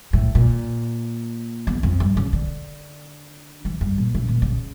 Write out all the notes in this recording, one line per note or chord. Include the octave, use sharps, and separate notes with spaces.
A2
A#2
E2
F2
G2
C#3
D3
E3
G2
A#2
C#3
A#2
C#3